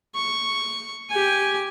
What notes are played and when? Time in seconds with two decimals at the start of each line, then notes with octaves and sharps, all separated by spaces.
0.15 C#6
1.10 G4 G#5